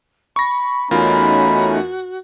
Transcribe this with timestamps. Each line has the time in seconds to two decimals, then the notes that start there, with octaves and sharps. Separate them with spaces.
0.36 B5 C#6 A#6
0.91 E2 A3 C#4 D#4 F4 F#4 A#4 B5